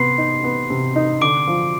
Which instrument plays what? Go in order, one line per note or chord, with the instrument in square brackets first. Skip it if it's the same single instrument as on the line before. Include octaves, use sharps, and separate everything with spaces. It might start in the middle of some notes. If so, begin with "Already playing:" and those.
Already playing: [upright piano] C3 B3 [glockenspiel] C6 C7
[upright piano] D#4
B3
C3
D#4
[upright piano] D3 [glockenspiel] D6 D7
[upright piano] F3